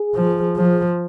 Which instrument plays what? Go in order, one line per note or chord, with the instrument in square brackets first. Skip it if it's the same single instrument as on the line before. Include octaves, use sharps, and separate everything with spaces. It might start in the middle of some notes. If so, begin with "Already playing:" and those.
Already playing: [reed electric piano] G#4
[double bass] F3
F3